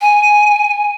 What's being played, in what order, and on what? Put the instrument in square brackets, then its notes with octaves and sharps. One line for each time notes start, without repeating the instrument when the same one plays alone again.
[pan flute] G#5